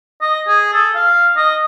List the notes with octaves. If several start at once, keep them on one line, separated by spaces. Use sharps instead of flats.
D#5
G#4
A4
F5
D#5